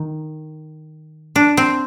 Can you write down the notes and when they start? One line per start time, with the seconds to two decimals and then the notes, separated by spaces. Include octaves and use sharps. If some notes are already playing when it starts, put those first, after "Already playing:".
Already playing: D#3
1.36 D4
1.57 C4